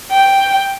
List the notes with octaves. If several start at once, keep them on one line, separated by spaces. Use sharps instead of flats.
G5